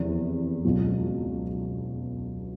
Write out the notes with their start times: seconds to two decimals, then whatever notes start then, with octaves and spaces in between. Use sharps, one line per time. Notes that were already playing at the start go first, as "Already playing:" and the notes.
Already playing: F1 E2 C3
0.64 C#2 B2 F#3